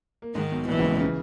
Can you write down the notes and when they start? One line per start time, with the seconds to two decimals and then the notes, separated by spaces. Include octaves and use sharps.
0.22 A#3
0.35 G#2 D#3 G#3
0.52 B1 B2
0.68 A#1 A#2 E3
0.79 C#2 C#3
0.90 C#2 C#3
1.01 C#3